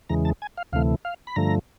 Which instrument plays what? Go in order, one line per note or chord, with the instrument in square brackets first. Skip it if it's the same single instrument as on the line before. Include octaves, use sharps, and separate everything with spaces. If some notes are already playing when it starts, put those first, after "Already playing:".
[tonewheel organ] E2 C#3 E3 G#3 A#5
A5
G#5
F5
D2 C3 E3 A3 F5
F5
B5
G2 D3 F3 A3 A#5